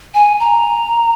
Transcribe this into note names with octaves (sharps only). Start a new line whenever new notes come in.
G#5
A#5